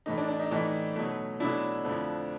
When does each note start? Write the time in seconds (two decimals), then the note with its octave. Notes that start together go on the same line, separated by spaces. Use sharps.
0.06 A2 E3 A3 D#4
0.18 D4
0.28 D4
0.40 D#4
0.51 A2 E3 A3 D#4
0.96 B2 F#3 A3
1.40 B2 F#3 A3 D4 E4
1.85 F2 D3 F3 A3